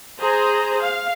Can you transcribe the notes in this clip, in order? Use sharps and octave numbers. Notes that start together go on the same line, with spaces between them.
G#4 C5 A#5
F5